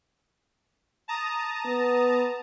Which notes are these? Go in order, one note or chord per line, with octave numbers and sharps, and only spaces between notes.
A5 A#5 D#6
B3